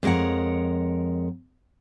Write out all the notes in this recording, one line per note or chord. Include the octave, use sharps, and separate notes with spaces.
F2 G#3 A#4 C#5 F#5